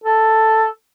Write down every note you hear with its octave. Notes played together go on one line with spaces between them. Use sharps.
A4